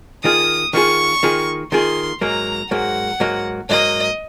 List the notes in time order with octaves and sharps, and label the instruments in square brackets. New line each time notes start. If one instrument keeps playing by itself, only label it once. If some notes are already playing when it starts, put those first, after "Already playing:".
[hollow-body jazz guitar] D#3 A#3 F4 G#4 [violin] D#6
[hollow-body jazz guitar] D#3 A#3 F4 G#4 [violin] C#6
[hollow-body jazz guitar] D#3 A#3 F4 G#4
[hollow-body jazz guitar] D#3 A#3 F4 G#4 [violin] C6
[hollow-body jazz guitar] G#2 F#3 A#3 [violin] A#5
[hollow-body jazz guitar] G#2 F#3 A#3 [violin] F#5
[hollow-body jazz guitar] G#2 F#3 A#3
[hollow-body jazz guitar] G#2 F#3 A#3 [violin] D#5